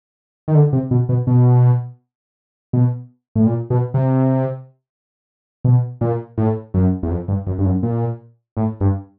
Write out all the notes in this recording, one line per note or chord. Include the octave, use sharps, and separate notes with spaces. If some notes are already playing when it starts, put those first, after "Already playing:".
D#3
D3
C3
B2
B2
B2
B2
A2
A#2
B2
C3
B2
A#2
A2
F#2
E2
F2
G2
F#2
G2
F#2
A#2
A2
G2